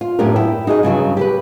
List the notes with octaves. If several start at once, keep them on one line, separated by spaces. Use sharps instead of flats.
F4
F#2 A2 B3 D4 G4 A#4
E4 G5
D#4 F#4 G#4 D#5
G2 C#3 F3 F#3
G4 A4 B4